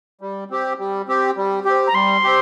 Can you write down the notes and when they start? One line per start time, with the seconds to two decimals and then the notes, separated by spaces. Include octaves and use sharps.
0.21 G3
0.50 C4 G4
0.79 G3
1.08 C4 G4
1.37 G3
1.65 C4 G4
1.87 A#5
1.94 G3 C6
2.23 C4 G4